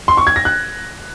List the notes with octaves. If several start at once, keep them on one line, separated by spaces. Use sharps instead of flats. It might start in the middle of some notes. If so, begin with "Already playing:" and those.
C6
C#6
G#6
A#6
F#6